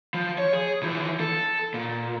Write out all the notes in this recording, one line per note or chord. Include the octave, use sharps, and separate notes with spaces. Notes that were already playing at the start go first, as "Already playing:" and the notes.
F3
C#5
G#4
E3 F3
A4
A#2